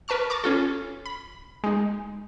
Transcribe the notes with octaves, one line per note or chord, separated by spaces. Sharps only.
A#4 B4 A5 C#6 F6
A5 A#5 C#6 D6
C#4 F4 A4
B5
G#3 D#4